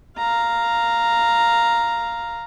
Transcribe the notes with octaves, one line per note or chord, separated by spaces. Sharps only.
F5 A#5